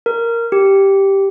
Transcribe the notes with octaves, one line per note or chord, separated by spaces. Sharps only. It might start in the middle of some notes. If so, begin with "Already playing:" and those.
A#4
G4